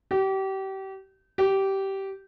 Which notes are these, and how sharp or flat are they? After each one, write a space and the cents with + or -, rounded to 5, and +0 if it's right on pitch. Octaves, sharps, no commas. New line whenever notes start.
G4 -30
G4 -15